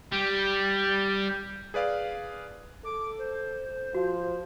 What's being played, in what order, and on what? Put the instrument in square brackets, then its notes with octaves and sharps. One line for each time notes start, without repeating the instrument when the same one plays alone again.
[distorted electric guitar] G3
[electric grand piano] G#4 B4 D5 F5
[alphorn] A4 [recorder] D6
[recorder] C5
[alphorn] F3 [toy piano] F#4